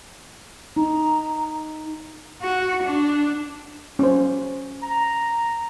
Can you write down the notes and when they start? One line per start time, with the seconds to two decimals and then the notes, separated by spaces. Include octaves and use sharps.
0.76 D#4 A#5
2.42 F#4
2.83 D4
3.99 C#4 C5
4.83 A#5